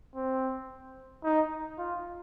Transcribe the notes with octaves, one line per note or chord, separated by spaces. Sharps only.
C4
D#4
F4